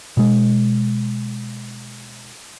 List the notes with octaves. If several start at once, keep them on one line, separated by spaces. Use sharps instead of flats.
B2 G#3